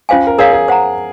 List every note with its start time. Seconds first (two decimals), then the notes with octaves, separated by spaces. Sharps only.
0.09 C#4 F4 C5 F5 G#5
0.27 A#4
0.39 G#4 A#4 C#5 F5
0.53 G#4
0.68 C5 F#5 A#5